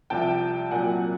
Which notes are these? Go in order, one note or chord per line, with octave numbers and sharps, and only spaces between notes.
C2 C3 F3 G5 A5
C2 A#2 F#3 F#5 G#5